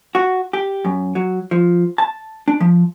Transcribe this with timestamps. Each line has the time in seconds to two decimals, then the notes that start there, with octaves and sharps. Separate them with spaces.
0.15 F#4
0.53 G4
0.85 F#2
1.15 F#3
1.51 F3
1.98 A5
2.48 D4
2.60 F3